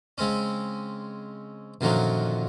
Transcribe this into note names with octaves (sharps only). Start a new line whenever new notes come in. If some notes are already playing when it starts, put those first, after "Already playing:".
C#3 G#3 C4 C#4
F#2 A#2 D3 D#3 F3 F#3